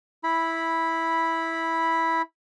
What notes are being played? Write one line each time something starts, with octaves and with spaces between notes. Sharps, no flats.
E4 B5